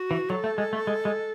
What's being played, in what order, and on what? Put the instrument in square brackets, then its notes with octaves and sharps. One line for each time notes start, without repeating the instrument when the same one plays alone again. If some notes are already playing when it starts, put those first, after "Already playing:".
Already playing: [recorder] F#4
[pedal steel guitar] E3
[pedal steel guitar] F#3 [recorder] A4
[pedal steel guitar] A3
G#3
A3
G#3
G#3